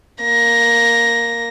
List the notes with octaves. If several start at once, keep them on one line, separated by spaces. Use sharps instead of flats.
A#3 A#6